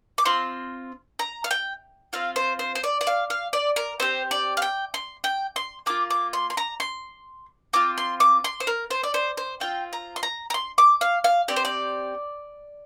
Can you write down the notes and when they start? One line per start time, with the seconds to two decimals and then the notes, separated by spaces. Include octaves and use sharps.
0.18 D6
0.25 C4 F4 C6
1.19 A#5
1.44 F5
1.51 G5
2.13 C4 F4 F5
2.36 C5
2.59 C5
2.75 C5
2.84 D5
3.01 D5
3.07 F5
3.30 F5
3.53 D5
3.76 A#4
4.00 C4 G4 C5
4.31 D5
4.57 F5
4.62 G5
4.94 C6
5.24 G5
5.56 C6
5.86 A#3 F4 D6
6.10 D6
6.33 C6
6.50 C6
6.57 A#5
6.80 C6
7.73 C4 F4 D6
7.98 C6
8.20 D6
8.44 C6
8.60 C5
8.67 A#4
8.91 C5
9.03 D5
9.14 C5
9.37 C5
9.60 C4 F4 G5
9.93 A#5
10.16 C6
10.23 A#5
10.50 A#5
10.54 C6
10.78 D6
11.01 F5
11.24 F5
11.48 C4 G4 D5
11.56 C5
11.65 D5